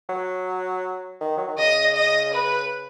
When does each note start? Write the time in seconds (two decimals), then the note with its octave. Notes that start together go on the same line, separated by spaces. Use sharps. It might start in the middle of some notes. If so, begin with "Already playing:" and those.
0.09 F#3
1.21 D#3
1.38 F#3
1.48 D#3
1.58 C#3 D#5
1.96 D#5
2.34 B4